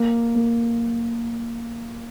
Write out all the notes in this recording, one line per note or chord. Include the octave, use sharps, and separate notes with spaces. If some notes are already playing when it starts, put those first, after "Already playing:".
Already playing: A#3
A#3